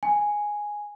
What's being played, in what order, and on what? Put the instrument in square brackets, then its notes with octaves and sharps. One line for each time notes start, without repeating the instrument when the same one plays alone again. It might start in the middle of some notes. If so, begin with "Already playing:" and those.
[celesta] G#5